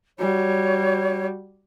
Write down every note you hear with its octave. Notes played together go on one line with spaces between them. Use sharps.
G3 F#4 C#5